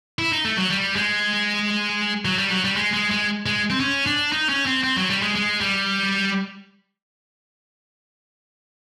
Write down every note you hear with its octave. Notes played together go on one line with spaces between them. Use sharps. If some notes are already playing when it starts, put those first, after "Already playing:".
E4
D#4
A3
F#3
G3
G#3
F#3
G3
F#3
G3
G#3
G#3
G#3
G#3
C4
C#4
D4
D#4
C#4
C4
C4
F#3
G3
G#3
G#3
G3